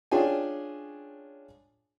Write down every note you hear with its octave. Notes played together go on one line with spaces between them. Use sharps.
C#4 D4 F4 G#4 G5 G#5